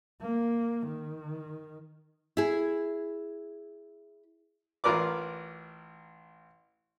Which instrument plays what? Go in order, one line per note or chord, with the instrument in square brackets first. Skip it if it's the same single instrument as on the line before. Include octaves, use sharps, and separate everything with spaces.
[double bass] A#3
D#3
[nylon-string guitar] E4 G#4
[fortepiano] A1 F4 A#4 B4 D5 D6